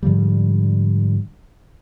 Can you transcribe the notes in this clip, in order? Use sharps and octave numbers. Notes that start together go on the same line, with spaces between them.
G#2 D3 F3 G3